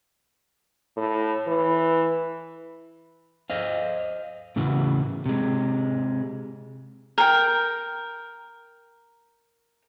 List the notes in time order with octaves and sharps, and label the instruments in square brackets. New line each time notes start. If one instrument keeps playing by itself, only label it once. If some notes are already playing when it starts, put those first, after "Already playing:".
[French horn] A2
E3
[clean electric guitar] C5 D#5 F5
A2 C#3 E3 F#4
C3 G#3
[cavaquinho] A#4 G5